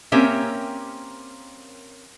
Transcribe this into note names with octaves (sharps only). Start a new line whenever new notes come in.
A#3 C4 C#4 G4 A#4 E5